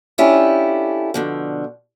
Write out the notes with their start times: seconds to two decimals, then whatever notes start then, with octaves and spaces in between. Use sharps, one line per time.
0.18 C#4 D4 E4 F4 G4 A4
1.14 B2 D3 F3